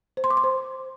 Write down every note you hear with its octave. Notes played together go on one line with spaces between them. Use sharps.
C5
C6
D6
C6
C5